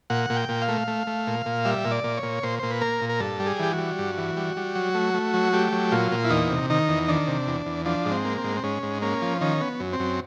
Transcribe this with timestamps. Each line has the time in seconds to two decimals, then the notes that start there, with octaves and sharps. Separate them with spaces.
0.10 A#2 F#5
0.30 A#2
0.36 G5
0.49 A#2
0.62 F5
0.68 A3
0.88 A3
1.07 A3
1.27 A#2
1.46 A#2
1.65 G3 E5
1.84 A#2
1.91 D5
2.04 A#2
2.17 C#5
2.23 A#2
2.43 A#2 C5
2.59 A#2 C5
2.71 B4
2.81 A#3 A#4
3.01 A#2
3.09 A#4
3.20 G2 A4
3.40 G3
3.46 G#4
3.59 E3 G4
3.73 F#4
3.78 G3
3.99 G2
4.18 E3
4.37 G3
4.57 G3
4.75 F#3
4.94 A3
5.14 A3
5.34 F#3
5.53 A3 G4
5.72 F#3
5.92 A#2 F4
6.12 A#2
6.25 E4
6.30 E2 D#4
6.50 C3
6.70 D#3 D#4
6.89 E2
7.08 D#3 D4
7.27 C3
7.47 E2
7.66 E2
7.85 F3 D4
8.05 G#2
8.11 C4
8.25 A#3
8.38 C4
8.44 G#2
8.57 C4
8.63 G#2 C#4
8.83 G#2
9.02 A#3 C#4
9.22 F3
9.41 D#3 C#4
9.61 B3
9.80 F#2
9.93 C4
10.00 F#2